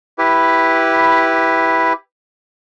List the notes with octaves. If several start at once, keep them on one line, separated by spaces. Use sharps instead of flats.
E4 G4 B4